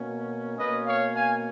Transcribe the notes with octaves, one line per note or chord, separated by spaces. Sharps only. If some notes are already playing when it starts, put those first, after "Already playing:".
Already playing: B2 A#3 C#4
B2 A#3 C#4 B4 D#5
C#5 F5
F5 G#5